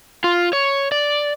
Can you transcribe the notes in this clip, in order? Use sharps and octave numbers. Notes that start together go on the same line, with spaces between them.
F4
C#5
D5